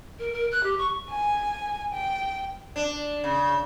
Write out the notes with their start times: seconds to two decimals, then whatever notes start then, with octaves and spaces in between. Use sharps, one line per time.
0.18 A#4
0.32 A#4
0.51 F#6
0.63 G4
0.78 C#6
1.09 G#5
1.93 G5
2.76 D4
3.24 C#3